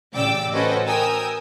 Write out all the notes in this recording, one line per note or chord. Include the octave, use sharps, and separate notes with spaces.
A1 C#3 D5 G5 D6 E6
C#4 F#4 A4 B4 C5 D#5
A#4 G5 G#5 D#6 E6